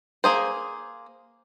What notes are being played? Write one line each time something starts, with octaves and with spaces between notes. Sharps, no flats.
A#3 G#4 C5